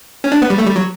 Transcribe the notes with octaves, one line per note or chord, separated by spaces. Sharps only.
C#4
D4
B3
G3
A3
G3
F#3